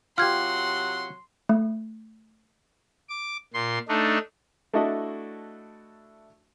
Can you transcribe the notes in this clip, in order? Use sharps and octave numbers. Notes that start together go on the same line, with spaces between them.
C3 F#3 F4 G4 F#5 C6 F6 G#6
A3
D6
A#2 C6
A3 D4 D#4
A3 D4 E4 F#4 D#5